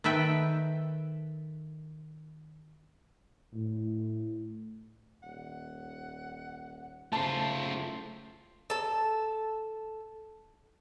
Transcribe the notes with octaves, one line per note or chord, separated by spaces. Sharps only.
D#3 A4 B4 E5 G5
A2
D#1 F#5
C#3 A3 F4 C5 A5
A4 A5